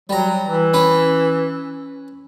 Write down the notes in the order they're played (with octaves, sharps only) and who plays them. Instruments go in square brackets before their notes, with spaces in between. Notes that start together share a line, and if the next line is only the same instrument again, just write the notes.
[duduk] F#3 [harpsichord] G3 A#5
[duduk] E3
[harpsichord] C#4 B4